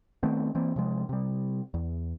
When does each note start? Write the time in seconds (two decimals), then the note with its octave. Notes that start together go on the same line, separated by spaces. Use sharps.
0.23 D#3 A3 B3 C4
0.55 E3 A#3 C4
0.76 C3 F3 G#3
1.09 C3 G3
1.74 E2